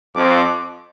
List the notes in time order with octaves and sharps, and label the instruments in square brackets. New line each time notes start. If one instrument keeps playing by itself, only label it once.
[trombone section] F2 [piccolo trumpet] D6